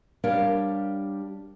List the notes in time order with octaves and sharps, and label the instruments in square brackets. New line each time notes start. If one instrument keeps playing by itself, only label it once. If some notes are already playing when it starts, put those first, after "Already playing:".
[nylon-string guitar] G3 D4 G4 A#4 C#5 F5